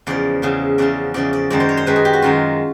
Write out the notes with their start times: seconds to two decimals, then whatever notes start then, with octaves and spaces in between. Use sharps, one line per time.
0.07 E2 C#3 F3 D5
0.42 E2 C#3 F3
0.78 E2 C#3 F3 D5
1.14 E2 C#3 F3 D5
1.33 D5
1.50 F#2 D#3 G#3 D5
1.60 C5
1.69 C#5
1.77 C5
1.86 F#2 D#3 G#3 B4
1.96 G#4
2.05 G4
2.13 F#4
2.22 F#2 D#3 G#3 F4